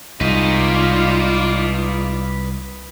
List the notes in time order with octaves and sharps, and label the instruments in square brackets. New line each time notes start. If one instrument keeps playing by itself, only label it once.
[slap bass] C2 [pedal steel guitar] G#3 D#4 [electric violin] F4 D5 [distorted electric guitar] B4 D#5